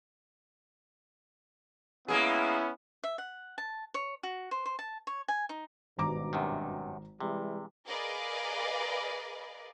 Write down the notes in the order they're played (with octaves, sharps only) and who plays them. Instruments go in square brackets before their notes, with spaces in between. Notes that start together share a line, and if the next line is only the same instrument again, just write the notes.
[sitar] G#3 A#3 G#4 [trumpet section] B3 C#4 E4
[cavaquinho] E5
F#5
A5
C#5
F#4
C5
C5
A5
C#5
G#5
D#4
[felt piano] G#1 A#5 D6 [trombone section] G2 B2
[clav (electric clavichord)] F#2 C3 D#3
[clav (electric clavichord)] C3 [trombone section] E3 G3 G#3
[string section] G#4 A#4 B4 D5 D#5 F5